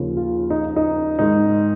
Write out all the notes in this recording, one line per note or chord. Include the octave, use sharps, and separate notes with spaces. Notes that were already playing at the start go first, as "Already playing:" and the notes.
Already playing: D#2 C#3 F3
F4
D#4
D#4
G#2 D#3 D#4